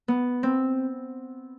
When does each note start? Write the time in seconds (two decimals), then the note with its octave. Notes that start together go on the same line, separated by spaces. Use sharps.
0.08 B3
0.43 C4